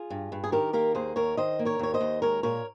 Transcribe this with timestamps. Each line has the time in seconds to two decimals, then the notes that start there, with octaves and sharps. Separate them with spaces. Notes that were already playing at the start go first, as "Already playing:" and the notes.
Already playing: F4 G#4
0.10 G2
0.32 G2
0.44 G#4
0.52 D#3 G4 A#4
0.73 A#3 G4 A#4
0.95 D#2 G#4 C5
1.16 D#2 A#4 C#5
1.37 D#3 C5 D#5
1.59 A#3
1.65 A#4 C#5
1.79 D#2 C#5
1.94 C5 D#5
2.01 D#2
2.22 G#3 A#4 C#5
2.43 A#2 A#4 C#5